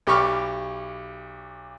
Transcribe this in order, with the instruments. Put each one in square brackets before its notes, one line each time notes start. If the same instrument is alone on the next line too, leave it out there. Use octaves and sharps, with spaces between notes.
[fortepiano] B1 G4 B5 C#6 D6 F6